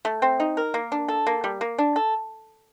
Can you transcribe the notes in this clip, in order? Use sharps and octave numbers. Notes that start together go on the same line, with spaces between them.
A3
C4
D#4
A#4
A#3
D4
A4
A#3
G3
A#3
D4
A4